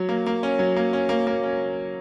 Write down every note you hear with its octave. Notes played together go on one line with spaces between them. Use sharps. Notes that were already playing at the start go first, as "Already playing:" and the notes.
Already playing: F#3
A#3
A#3
C#4
F#3
A#3
C#4
A#3
A#3
C#4